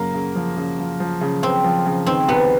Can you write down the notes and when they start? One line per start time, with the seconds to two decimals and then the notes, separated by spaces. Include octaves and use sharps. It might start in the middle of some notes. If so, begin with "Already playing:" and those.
Already playing: F#2 C#3 A#3
0.14 C#3
0.35 F3
0.57 C#3
0.79 F3
1.00 F3
1.21 C#3
1.43 C#3 C4
1.64 F3
1.86 C#3
2.06 D#3 C4
2.28 C2 B3